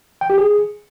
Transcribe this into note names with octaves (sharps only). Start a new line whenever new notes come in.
G5
G4
G#4